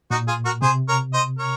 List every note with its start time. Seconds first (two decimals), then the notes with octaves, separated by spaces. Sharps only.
0.11 A#2 D#4 F#4
0.28 F4 G#4
0.45 F#4 A#4
0.62 C3 G#4 C5
0.88 A#4 C#5
1.14 C5 D#5
1.39 A#4 C#5